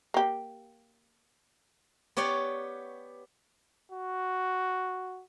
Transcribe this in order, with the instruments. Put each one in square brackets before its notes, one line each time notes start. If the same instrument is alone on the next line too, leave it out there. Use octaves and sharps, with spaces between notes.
[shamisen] A#3 G4
[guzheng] B3 G4 C#5 D5 F#5
[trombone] F#4